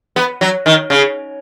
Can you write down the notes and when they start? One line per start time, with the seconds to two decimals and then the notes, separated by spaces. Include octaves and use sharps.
0.16 B3
0.41 F#3
0.66 D#3
0.90 C#3